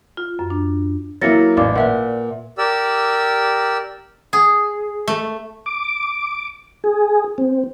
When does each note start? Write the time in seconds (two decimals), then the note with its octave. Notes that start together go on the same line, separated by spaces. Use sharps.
0.17 F4
0.39 F#2
0.50 D4
1.21 F#3 A#3 E4 A6 A#6 C#7
1.57 A1 D5 F5 D6
1.76 A#2 B4 E5 F#5
2.58 G4 A#4 D5 E6
4.33 G#4
5.08 A3
5.66 D6
6.84 G#4
7.38 C4